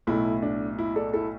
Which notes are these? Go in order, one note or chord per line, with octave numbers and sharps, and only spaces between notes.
B1 A2 A3 E4
D4
E4
A4 D5
E4 A4